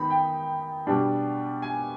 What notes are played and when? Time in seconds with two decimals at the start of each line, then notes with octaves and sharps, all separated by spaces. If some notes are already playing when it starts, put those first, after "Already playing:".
Already playing: D#3 B3 D#4 B5
0.10 G5
0.87 B2 G3 D4
1.62 G#5